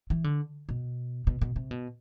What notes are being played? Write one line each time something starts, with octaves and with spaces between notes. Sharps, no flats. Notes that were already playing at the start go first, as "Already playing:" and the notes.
E3
D3
B2
B2
B2
C3
B2